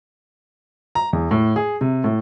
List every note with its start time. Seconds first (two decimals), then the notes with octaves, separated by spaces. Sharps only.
0.95 A#5
1.13 E2
1.31 A2
1.56 G#4
1.81 C3
2.04 A2